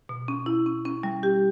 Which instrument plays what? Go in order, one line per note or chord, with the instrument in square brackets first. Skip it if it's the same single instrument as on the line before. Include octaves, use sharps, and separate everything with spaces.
[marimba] B2
C#4
E4
C#4
C#4
G3
G4